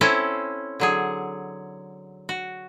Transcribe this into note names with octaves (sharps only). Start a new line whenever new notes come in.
C4 C#4 E4 A4 C5
D3 F#3 G#4
F#4